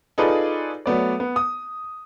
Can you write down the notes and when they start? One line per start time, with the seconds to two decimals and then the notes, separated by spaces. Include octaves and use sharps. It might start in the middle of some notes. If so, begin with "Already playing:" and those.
0.18 D#4 F4 G#4 A4 B4 D5
0.86 F#3 A3 B3 D5
1.20 B3
1.36 D#6